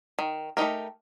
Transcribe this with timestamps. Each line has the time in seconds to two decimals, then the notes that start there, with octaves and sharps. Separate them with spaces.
0.19 D#3
0.57 A3 D#4 G4 A#4